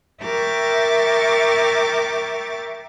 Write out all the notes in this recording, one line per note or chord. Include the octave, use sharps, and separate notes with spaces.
A#4 E5 G5 C#6 D6 A6